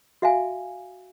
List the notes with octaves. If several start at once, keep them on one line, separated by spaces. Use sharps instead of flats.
F#4 E5 F5 G#5